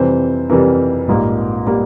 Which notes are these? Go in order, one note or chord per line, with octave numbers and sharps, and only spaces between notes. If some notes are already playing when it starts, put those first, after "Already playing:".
Already playing: F2 C3 E3 G3 C5
F2 C3 E3 G3 A#4
A#1 G#2 G3 A#3
G3 A#3